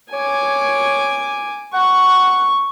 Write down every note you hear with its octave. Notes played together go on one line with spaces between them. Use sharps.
C#5 G#5 D6
F#5 C#6